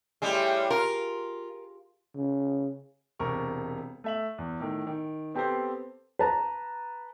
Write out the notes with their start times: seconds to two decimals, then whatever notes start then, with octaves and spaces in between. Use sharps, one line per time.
0.22 A2 G3 G#3
0.70 F4 A#4
2.15 C#3
3.19 E1 C3 A#4 C#6
4.04 A3 E5 F#7
4.38 E2
4.60 A2 D#3
4.87 D#3
5.35 B3 C4 G4 A4 B4 C5
6.19 B4 A5 A#5